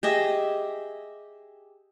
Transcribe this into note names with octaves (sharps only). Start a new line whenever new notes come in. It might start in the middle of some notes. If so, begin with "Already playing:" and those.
G4 G#4 D#5 E5